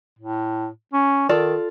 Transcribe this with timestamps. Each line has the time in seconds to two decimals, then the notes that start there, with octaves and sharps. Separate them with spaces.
0.19 A2
0.93 C#4
1.29 D#3 F4 A4 D5